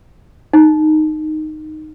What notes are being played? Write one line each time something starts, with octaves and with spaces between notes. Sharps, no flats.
D#4